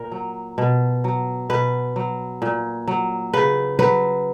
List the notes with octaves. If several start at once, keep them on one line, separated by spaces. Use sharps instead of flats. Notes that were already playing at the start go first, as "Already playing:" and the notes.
Already playing: A#2 A#4
F#3
B2
F#3
B2 B4
F#3
A#2
F#3
C#3 B4
F#3 B4